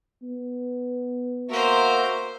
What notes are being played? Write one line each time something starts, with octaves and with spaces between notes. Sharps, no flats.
B3
A#3 F#4 A#4 C5 E5